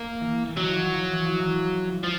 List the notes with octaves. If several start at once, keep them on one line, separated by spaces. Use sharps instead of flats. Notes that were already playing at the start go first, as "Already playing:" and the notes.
Already playing: A#3
E3
E3
D#3 F#3
E3 F3
F3
E3
F3
E3
F3